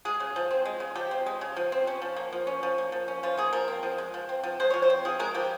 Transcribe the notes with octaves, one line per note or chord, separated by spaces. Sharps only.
G#3 G#4
C#3
F3
C4
G#3
C#3
F3 G4
C4
G#3
C#3
F3
C4
C#4
F3
A#3
F3
C#4
F3
A#3
F3
C#4
F3 F4
A#3 G#4
F3 A#4
C4
F3
G#3
F3
C4
F3
G#3 C5
F3 C#5
C5
C4
F3 G#4
G#3 A#4
F3 G4